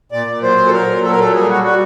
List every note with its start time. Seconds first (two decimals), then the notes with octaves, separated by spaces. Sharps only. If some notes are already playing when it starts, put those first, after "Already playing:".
0.12 A#2 D5
0.27 A#2
0.42 F#3 C5
0.57 A#2
0.67 A4
0.72 F#3 A#4
0.88 A#2
1.03 F#3 A4
1.11 A#4
1.18 A#2 A4
1.33 G3 G#4
1.48 G3 F#4
1.63 G3 F#4